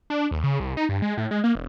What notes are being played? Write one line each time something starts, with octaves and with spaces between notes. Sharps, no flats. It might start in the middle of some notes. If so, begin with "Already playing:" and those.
D4
D#2
C#3
C2
D#4
G2
G#3
A2
G#3
A#3
E1